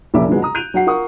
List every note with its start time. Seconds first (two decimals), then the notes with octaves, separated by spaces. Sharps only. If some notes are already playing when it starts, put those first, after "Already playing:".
0.14 F1 A#1 A#3 C#4 E5 D6
0.29 G#2 D3 F3 F#3 G#3 B3
0.42 A#5 D#6
0.55 F#6 G6 D7 D#7 F7
0.74 F#3 F#4 F#5 C7
0.86 F4 A#4 F#5 C#6 D#6